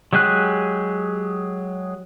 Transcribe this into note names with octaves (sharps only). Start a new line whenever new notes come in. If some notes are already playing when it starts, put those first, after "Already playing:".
F#3 G#3 G4 G#4 F#6